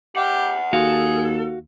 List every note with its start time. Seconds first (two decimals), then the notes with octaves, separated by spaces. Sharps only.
0.16 G4 E5 F#5
0.73 D#2 F#4 G#4 A4 F5